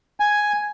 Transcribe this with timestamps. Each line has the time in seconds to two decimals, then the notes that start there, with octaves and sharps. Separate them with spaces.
0.20 G#5